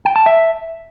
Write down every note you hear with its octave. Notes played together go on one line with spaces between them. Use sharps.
G5
A5
E5